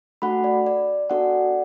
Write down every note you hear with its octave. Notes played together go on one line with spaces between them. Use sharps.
A3 D4 F#4 A4 F#5 B5
D5
D5
B3 D4 F#4 A4 D5 F#5